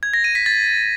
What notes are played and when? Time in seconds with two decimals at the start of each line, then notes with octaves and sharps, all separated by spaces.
0.03 G#6
0.14 A#6
0.24 D#7
0.35 B6
0.46 A6